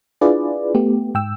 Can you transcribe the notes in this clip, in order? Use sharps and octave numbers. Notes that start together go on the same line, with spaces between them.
D4 E4 F4 G#4 B4 D5
A3 B3 G4
G#2 G5 E6